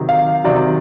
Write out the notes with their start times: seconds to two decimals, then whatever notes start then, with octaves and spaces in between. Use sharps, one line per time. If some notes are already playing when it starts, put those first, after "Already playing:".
Already playing: C3 D#3 F#3
0.09 F5
0.44 C3 D#3 F#3 D5